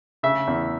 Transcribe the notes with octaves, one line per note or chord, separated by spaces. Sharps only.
C#3 E5
E2